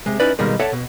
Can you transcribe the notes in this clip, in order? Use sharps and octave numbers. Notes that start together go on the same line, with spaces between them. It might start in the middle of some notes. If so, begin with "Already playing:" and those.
C3 G#3
C#4 D#4 E4 B4 D5
B2 D#3 G3 G#3 A#3
A4 C#5 D5 E5 F#5 A5
B2